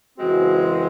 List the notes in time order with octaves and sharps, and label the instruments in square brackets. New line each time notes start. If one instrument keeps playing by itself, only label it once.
[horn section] F#2 C#3 E3 G#3 C4 [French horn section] F#4